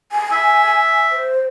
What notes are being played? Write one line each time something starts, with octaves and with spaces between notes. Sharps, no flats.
G#5
E5
C5